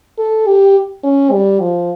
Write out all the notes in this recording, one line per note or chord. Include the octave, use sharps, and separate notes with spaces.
A4
G4
C#4
G3
F3